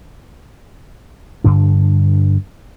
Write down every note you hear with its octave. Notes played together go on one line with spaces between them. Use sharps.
G2 D3 D4